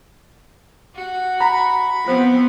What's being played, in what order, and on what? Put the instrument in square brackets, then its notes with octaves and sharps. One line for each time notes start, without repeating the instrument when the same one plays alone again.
[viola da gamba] F#4
[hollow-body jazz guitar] A#5 [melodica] B5
[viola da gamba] F3 B3 C4 [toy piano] F4 C5